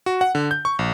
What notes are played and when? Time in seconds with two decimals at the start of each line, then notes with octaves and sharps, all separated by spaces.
0.06 F#4
0.21 F#5
0.35 D3
0.51 G6
0.65 C#6
0.79 A#1